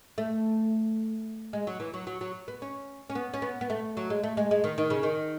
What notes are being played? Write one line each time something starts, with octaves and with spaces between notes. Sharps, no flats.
A3
G#3
F#3
E3
F#3
F#3
F#3
B3
C#4
C#4
B3
C#4
B3
B3
A3
F#3
G#3
A3
G#3
G#3
D#3
D#3
C#3
D#3